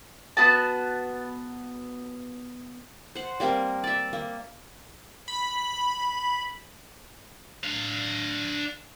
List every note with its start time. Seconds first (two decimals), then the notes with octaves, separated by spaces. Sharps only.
0.37 B3 F#4 A5
3.15 C5 F#5
3.40 G3 A#3 C4 A#4
3.84 D5 E5
4.13 A#3
5.28 B5
7.64 D4 F5